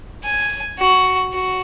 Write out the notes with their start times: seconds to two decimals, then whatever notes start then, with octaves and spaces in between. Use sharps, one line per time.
0.24 G#5
0.79 F#4
1.33 F#4